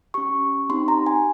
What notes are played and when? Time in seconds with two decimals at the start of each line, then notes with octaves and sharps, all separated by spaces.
0.14 C#4 G4 C#6
0.69 C4 D#4 G4 C6
0.88 A#5
1.06 G#5